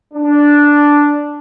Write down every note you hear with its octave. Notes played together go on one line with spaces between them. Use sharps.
D4